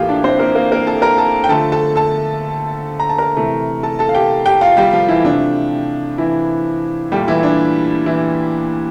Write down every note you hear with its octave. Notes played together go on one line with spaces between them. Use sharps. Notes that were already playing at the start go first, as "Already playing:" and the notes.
Already playing: A2 E3 A#3 F4 G4 A4 F5 G5
D4 D5
C4 C5
A#3 A#4
A#3 A#4
A#3 A#4
A4 A5
A#4 A#5
A4 A5
G5
D3 F3 A3 A4 A5
A4 A5
A4 A5
A#5
A5
A#4 A#5
C3 E3 A3
A4 A5
A4 A5
F5
G4 G5
G4 G5
F4 F5
G3 G4
F3 F4
E3 E4
C3 F3 A3 D4
E3 E4
A#2 G3 A3 G4
E3 E4
D4
E3 E4